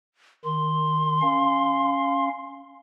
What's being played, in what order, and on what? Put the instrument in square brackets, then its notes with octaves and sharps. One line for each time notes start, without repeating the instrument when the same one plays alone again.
[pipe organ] D#3 [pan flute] C6
[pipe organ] C#4 F5